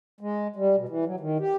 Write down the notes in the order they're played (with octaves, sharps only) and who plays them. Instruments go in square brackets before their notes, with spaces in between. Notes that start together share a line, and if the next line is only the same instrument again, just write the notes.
[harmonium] G#3
G3
B2
E3
F#3
D#3
G4